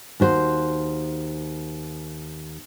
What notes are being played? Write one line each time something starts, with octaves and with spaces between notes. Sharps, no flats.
D#2 F#4 C5